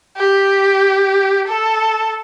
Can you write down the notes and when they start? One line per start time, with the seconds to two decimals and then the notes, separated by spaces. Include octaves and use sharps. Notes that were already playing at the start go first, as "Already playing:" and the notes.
0.17 G4
1.48 A4